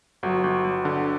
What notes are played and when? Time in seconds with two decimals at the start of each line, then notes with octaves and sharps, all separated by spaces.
0.23 G1 F#3
0.44 G1
0.64 G1
0.85 D3